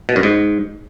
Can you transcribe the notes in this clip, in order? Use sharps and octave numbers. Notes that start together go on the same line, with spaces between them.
B2
F#2
G#2